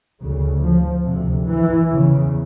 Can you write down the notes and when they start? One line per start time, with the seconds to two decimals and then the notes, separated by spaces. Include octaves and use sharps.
0.20 D2 C#3
0.62 F3
1.05 D2 C3
1.47 E3
1.89 E2 C#3